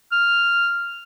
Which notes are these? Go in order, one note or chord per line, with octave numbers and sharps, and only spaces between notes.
F6